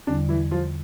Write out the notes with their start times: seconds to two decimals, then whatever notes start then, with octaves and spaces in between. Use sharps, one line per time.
0.07 E2 D3 G3 D4
0.29 E3 E4
0.51 F3 F4